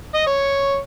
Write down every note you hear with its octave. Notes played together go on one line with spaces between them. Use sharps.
D#5
C#5